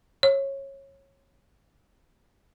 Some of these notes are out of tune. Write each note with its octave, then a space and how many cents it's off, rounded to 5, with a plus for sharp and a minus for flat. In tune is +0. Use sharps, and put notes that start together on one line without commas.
C#5 -20